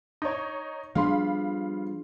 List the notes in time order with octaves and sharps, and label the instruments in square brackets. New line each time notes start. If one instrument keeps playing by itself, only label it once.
[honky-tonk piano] D#4 C#5
[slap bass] F3 G3 B3 [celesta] D4 G#4 C6 [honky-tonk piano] F5 B5